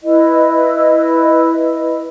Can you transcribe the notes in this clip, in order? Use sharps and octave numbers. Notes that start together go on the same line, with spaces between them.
E4 B4 D#5